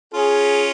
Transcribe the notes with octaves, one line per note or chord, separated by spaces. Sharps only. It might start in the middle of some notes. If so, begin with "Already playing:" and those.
C#4 F4 G#4